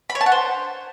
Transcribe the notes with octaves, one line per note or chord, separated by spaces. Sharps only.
B5
C#5
A5
F#5
C5